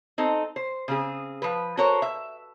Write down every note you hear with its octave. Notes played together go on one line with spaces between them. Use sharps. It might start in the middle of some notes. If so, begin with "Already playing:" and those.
C4 D#4 A4
C5
C#3 C4 G#4
F3 B4
F#4 A4 A#4 C5 C#5
E5